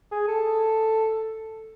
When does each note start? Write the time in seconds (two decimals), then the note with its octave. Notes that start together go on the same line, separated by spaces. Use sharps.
0.11 G#4
0.28 A4